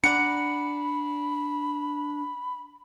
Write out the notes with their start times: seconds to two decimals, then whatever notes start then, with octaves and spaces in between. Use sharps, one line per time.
0.04 D4 D5 F#5 A#5 B5 C#7